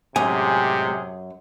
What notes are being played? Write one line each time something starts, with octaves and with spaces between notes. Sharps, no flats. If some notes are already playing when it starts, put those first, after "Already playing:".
F#2 A2 C3 G#3 G4 G#4 G#5